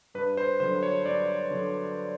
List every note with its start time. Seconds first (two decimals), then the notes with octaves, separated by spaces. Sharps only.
0.14 G2 B4
0.37 C5
0.60 D3 F#3 C5
0.83 C#5
1.05 G2 D5
1.51 D3 F#3